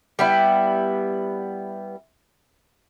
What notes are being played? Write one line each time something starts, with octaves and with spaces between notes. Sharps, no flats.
G3 B3 E4